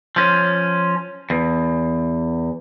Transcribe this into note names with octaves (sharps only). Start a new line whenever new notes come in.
F3 C#4
E2